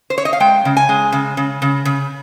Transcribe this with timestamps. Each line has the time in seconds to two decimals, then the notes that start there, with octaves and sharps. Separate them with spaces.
0.10 C5
0.18 C#5
0.25 D#5
0.33 F5
0.40 G#3 G5
0.65 C#3
0.77 G#5
0.89 G#3
1.12 C#3
1.37 C#3
1.62 C#3
1.85 C#3